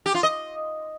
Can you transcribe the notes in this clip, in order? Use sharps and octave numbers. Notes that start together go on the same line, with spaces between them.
G4
F4
D#5